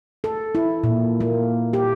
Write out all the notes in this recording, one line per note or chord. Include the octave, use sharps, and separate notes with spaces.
A4
E4
A#2
A#3
G4